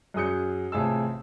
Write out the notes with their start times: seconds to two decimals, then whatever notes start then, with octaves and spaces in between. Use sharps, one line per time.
0.14 F#2 F#3 G#4 D#6 G6 C#7
0.72 A1 C3 F4 G#4 A5 E6